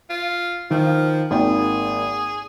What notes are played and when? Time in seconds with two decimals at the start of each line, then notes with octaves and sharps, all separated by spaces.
0.10 F4
0.71 D#3 F3
1.31 G#1 A#3 G#4 G5